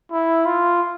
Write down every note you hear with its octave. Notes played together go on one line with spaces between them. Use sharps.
E4
F4